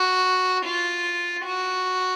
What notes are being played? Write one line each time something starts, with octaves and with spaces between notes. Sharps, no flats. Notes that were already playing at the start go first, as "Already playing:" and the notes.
Already playing: F#4
F4
F#4